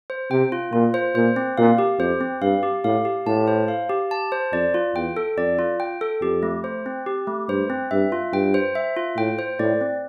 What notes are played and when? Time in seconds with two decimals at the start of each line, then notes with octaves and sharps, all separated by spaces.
0.10 C5
0.31 C3 G5
0.52 F4
0.72 A#2 F4
0.94 C5
1.15 A#2 C5
1.36 C4
1.57 A#2 F5
1.78 G4
1.99 F2 C5
2.21 C4
2.42 G2 F5
2.63 G4
2.84 A2 F5
3.05 G4
3.26 A2 A5
3.48 C5
3.68 F5
3.90 G4
4.11 A5
4.32 C5
4.53 F2 D5
4.74 F4
4.95 E2 G5
5.17 A4
5.37 F2 D5
5.59 F4
5.80 G5
6.01 A4
6.21 F2 G4
6.43 A3
6.64 C5
6.86 C4
7.06 G4
7.27 A3
7.48 G2 C5
7.70 C4
7.91 G2 E5
8.12 F4
8.33 G2 G5
8.54 C5
8.75 E5
8.97 F4
9.17 A2 G5
9.39 C5
9.59 A2 D5
9.81 C4